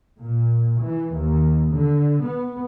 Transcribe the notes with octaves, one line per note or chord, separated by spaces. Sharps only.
A#2
E3
D#2
D3
B3